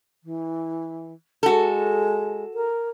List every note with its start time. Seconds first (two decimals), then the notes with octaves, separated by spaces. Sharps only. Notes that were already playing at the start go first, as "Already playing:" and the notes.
0.23 E3
1.43 G#3 F#4 A4
2.54 A#4